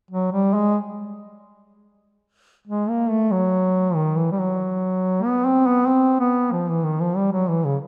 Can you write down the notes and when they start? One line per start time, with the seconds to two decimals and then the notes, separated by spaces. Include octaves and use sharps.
0.11 F#3
0.32 G3
0.54 G#3
2.67 G#3
2.89 A#3
3.10 A3
3.31 F#3
3.95 D#3
4.17 E3
4.32 G3
4.39 F#3
5.24 B3
5.45 C4
5.67 B3
5.87 C4
6.20 B3
6.52 F3
6.68 E3
6.84 D#3
7.00 F3
7.16 G3
7.32 F#3
7.48 E3
7.65 C#3